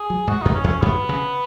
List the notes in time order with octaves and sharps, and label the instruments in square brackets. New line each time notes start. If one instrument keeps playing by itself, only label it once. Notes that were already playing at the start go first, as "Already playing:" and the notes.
Already playing: [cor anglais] G#4
[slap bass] F#3
[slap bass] G#2 [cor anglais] F#4
[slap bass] F#2 [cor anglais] D#4
[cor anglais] C#4
[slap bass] E2
[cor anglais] C#4
[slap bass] F#2 [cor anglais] B3
[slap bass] C#3